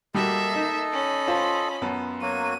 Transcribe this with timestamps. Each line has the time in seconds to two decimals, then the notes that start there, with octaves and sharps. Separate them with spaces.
0.15 G3 A#3 F#4 A4 D#5 E5
0.56 D#4
0.92 C#4 B5
1.28 F4 C5 A5
1.82 F#2 B3 A5
2.22 F#3 A#3 F#4 D#7